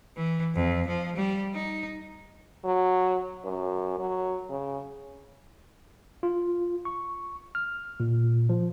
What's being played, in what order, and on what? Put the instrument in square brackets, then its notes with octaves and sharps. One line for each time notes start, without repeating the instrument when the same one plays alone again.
[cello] E3
F2
F3
G3
D#4
[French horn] F#3
F#2
F#3
C#3
[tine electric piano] F4
C#6
F6
A#2
F3